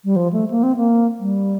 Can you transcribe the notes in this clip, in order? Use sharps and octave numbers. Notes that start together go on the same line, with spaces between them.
G3
F3
A3
A#3
C4
A#3
G3